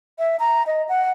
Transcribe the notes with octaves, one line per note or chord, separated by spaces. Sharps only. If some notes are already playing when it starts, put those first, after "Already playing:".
E5
A#5
D#5
F#5